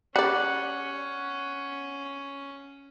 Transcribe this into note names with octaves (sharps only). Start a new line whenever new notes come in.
G3 C#4 D5 F#5